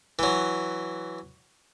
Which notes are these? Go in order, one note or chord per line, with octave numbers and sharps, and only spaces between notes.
E3 F#3